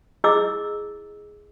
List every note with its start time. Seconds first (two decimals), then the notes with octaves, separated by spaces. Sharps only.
0.24 E4 G#4 D#5 D6 E6